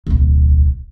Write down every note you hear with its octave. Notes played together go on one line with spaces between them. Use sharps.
D1 B1